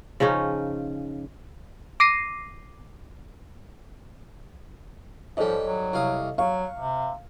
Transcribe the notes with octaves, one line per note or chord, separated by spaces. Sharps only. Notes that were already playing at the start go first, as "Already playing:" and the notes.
C#3 F3 C#4 D#4
D6 A#6 C7 D#7
G#2 F3 G3 A4 C#5 D#5
F#3
C2 F5 D#6
F#3 F5 C#6
C3